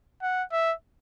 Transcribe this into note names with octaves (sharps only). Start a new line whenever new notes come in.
F#5
E5